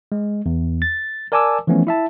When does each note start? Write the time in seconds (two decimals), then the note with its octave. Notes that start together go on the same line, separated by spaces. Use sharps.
0.12 G#3
0.46 E2
0.82 A6
1.32 A#4 D5 G#5 A5 D6 E6
1.67 E3 F3 A3 B3 C#4
1.87 E4 E5 A5